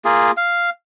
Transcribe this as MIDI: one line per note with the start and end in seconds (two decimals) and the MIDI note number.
0.05 0.31 58
0.05 0.31 65
0.05 0.31 68
0.37 0.70 77